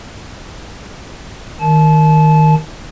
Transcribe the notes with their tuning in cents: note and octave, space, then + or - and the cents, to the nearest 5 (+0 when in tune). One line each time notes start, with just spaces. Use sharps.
D#3 +0 A5 -30